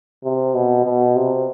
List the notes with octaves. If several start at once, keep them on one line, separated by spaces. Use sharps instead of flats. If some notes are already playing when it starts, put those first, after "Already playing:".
C3
B2
B2
C3